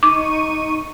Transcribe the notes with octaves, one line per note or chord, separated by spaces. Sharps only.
D#4 C#6 D6 D#7